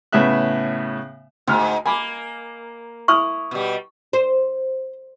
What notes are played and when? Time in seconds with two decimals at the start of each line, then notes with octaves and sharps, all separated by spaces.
0.12 A2 C#3 B3 E5 F#6
1.47 D2 G#2 F6
1.86 A#3 G#5 B5 D6
3.08 E4 C#6 D#6 F6
3.51 B2 G3
4.13 C5